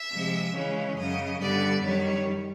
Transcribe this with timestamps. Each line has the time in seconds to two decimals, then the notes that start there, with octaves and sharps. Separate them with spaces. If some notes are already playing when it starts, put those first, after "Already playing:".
Already playing: E5
0.12 C3 F3 G#3
0.54 C#3 E3 G#3 C#4
0.97 F#2 C#3 F#3 D#5
1.41 G2 D3 G3 B3 D5
1.84 F#2 D#3 G3 C#5